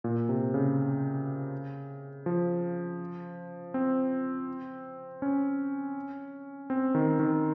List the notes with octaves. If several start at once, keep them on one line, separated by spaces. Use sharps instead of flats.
A#2
C3
C#3
F3
C4
C#4
C4
D#3
D#3